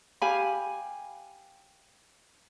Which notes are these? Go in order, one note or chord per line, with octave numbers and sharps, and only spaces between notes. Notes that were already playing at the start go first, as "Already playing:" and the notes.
G4 F5 G#5 B5